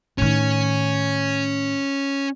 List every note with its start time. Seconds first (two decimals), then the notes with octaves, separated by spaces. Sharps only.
0.18 A2 D#3 C#4